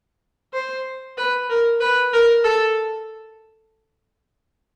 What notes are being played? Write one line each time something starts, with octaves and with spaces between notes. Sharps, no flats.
C5
B4
A#4
B4
A#4
A4